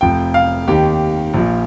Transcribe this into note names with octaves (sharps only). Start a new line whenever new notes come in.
F1 F2 F3 G5
F5
D#2 D#3 G4
A#1 A#2 F3